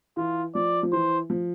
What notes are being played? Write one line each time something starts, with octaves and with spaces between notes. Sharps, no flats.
E3 F4
F3 D5
F3
E3 C5
F3